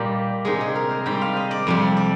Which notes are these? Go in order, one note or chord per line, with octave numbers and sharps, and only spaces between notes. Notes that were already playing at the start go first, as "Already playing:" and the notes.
Already playing: A#2 G3 D#4 F4 G4
C3 D#3 G#3 G#4
G#4
A#4
C5
G#2 G3 G5
F5
D#5
D5
F2 C3 G3
D5